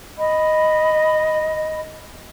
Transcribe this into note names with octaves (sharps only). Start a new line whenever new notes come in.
D#5 B5